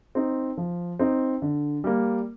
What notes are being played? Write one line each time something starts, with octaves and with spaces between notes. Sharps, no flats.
C4 D#4
F3
C4 D#4
D3
G3 A#3